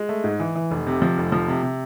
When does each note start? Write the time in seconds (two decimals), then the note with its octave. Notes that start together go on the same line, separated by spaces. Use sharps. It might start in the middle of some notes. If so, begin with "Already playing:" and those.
Already playing: G#3
0.09 A3
0.24 G#2
0.40 E3
0.55 E3
0.71 F1
0.87 C3
1.02 F3
1.18 F1
1.32 F3
1.48 C3
1.63 C3